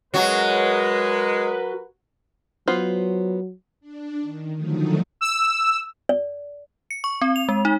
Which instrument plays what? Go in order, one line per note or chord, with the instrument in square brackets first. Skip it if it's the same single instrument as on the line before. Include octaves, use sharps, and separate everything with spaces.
[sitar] F#3 F#4 [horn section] G#3 [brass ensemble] A#4 B4
[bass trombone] F#3 [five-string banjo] B3 F4 C5
[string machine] D4
D#3
D3 D#3 F3 F#3 A3 D#4
[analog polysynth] E6
[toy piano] D5
[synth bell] C#7
C#6
C4
F7
G#3
D#4